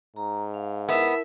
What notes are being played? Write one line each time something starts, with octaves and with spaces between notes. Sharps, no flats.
G#2 A#5
F5
B3 E4 A#4 E5 A5